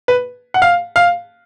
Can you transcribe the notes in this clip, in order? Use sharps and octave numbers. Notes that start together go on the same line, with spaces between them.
B4
F#5
F5
F5